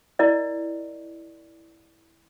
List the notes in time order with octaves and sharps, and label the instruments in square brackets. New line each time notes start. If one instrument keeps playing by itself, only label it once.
[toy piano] E4 A#4 D5 D#5